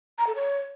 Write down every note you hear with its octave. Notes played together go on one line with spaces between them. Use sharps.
A#5
A4
C#5